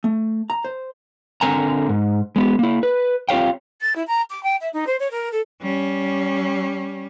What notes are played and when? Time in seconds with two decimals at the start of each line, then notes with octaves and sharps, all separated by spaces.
0.04 A3
0.50 A#5
0.64 C5
1.41 D3 C4 A#4 G#5 A#5
1.89 G#2
2.36 G#3 B3 G4
2.59 A#3 E4
2.83 B4
3.29 C4 F4 G4 C#5 F5 G5
3.81 A6
3.95 E4
4.07 A#5
4.30 D6
4.43 G5
4.60 E5
4.73 D#4
4.86 C5
4.99 C#5
5.11 A#4
5.31 A4
5.62 G3 C#4